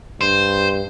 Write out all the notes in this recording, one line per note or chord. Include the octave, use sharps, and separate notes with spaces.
G2 C5